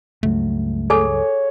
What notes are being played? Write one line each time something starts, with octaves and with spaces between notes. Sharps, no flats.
C#2 G2 F#3 A3
G#4 A4 C#5 G#5